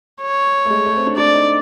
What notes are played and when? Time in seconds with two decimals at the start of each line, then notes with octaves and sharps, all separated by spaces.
0.22 C#5
0.65 A3
0.70 G#3
0.85 A3
0.96 C4
1.06 D4
1.16 D4 D5
1.33 D#4